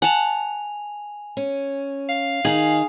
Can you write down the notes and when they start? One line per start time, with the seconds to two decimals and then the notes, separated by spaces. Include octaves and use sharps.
0.02 F#5 G#5 A5 F7
1.37 C#4
2.09 F5
2.45 D#3 D#4 G#4 G#5 F#7